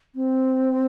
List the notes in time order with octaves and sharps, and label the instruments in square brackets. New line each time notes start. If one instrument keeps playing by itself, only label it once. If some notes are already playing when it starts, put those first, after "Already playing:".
[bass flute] C4